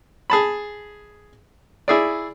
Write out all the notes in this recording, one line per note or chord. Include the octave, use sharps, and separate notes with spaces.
G#4 A5 B5
E4 G#4 D5